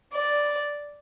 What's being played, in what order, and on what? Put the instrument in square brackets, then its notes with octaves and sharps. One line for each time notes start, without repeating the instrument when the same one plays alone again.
[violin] D5